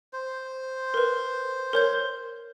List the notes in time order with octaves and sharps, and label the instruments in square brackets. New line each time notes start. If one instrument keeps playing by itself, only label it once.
[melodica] C5
[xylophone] A#4 B4
A#4 C#5 G6